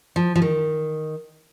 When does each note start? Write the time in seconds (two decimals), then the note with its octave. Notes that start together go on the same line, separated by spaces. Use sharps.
0.16 F3
0.36 F3
0.42 D#3